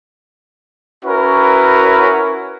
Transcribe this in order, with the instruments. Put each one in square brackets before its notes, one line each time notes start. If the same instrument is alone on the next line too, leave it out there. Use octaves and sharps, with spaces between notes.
[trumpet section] C#4 E4 F#4 A#4 B4